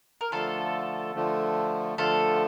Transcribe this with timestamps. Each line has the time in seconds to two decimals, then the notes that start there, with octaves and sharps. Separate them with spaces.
0.21 A#4
0.32 D3 F3 A3 F4 A4
1.15 D3 F3 A3
1.98 D3 F3 A3 F4 A4